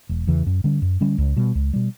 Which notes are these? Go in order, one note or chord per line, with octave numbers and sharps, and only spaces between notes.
E1
E2 C#3 E3
F#2
D3 G3 C#4
F#2
D3 G3 C#4
C#2
B2 G3
C#2
B2 G3